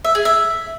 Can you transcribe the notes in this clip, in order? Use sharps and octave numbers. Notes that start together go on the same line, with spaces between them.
E5
G#4
E5